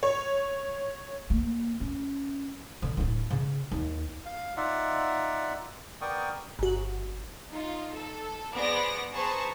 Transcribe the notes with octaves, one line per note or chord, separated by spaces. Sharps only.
C#5
A#3
C#4
D3
D1 E4
C#3
D#2
F5
D#4 F4 D5 E5 F#5
B3 A#4 D5 G5 C#6 D#6
G1 F#4
D#4 F4
A4
B3 G#4 C5 D5 A#6 D7
G#4 B4 C5 A5 A#5 C#6